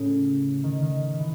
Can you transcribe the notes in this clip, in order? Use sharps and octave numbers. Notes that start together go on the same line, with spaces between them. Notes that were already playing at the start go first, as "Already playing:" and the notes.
Already playing: A2 C#3
D#3
D#3
E3